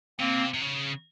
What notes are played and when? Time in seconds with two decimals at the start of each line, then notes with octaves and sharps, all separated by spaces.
0.19 C3 A#3 C4
0.54 C3
0.61 C#3